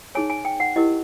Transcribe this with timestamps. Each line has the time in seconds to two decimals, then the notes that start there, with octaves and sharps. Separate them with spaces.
0.15 D#4 G#4 C#5 G#5
0.30 G#5
0.45 G5
0.60 F#5
0.76 E4 G4 A#4 D#5